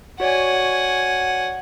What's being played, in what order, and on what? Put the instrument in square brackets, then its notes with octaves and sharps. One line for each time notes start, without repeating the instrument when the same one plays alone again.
[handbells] F#4 C#5 D5 [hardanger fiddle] F#5 G#5